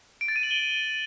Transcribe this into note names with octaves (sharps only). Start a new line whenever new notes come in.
D7
A6
D#7
F#7
G7